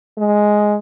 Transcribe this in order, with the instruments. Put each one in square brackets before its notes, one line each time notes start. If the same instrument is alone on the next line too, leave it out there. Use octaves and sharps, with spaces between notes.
[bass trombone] G#3